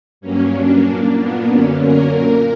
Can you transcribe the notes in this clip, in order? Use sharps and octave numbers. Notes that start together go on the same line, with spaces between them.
G2 F#3 A#3 C#4
D4
A#2 A#3
B3
F#2 D3 F#3 A#3 C#4
A#4
A#2 A#3 A#4